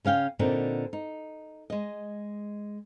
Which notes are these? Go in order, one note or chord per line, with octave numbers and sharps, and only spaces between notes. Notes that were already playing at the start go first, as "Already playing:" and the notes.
C#3 C#4 F5 G5
A#2 D3 B3 C4 D#4
D#4
G#3 D#5